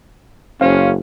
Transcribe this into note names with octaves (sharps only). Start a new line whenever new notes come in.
F#1 C#4 C5 F5